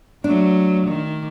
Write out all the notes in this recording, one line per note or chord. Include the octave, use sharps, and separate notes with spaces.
F#3 A3 D4
D#3